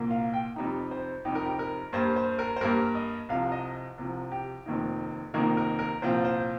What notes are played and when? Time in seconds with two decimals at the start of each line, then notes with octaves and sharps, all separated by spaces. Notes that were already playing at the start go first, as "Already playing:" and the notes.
Already playing: C2 A#2 A#3
0.11 F5
0.34 G5
0.56 F2 C3 G3 D#4 A#5
0.91 C5
1.25 F2 C3 G3 D#4 G4
1.35 A#4
1.46 G4
1.59 A#4
1.93 G2 G3 A#3 C5
2.16 C5
2.39 A#4
2.56 C5
2.61 G2 G3 A#3 A#4
2.95 D#5
3.29 C2 C3 F3 F5
3.52 D#5
3.98 C2 C3 F3
4.32 G4
4.66 F1 F2 D#3 A#3 D#4
5.34 F1 F2 D#3 A#3 D#4 A#4
5.57 A#4
5.79 A#4
6.02 C2 A#2 F3 C4 F4 C5
6.24 C5